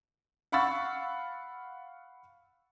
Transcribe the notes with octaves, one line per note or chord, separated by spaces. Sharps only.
F5 F#5 B5 C#6 E6 A6